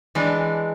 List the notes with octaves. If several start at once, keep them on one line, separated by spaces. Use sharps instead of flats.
E3 G#3 D4